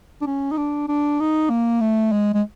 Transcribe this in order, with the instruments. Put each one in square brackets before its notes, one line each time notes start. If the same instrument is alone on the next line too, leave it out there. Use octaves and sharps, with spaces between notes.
[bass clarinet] D4
C#4
D#4
D4
D4
D#4
A#3
A3
G#3
G#3